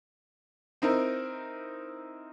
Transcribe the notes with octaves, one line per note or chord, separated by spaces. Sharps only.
C4 D#4 E4 A#4